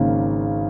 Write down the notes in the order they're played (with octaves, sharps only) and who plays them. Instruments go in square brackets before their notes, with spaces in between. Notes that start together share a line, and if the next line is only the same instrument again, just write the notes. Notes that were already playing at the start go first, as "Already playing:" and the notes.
Already playing: [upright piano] G#1 C#3 A#3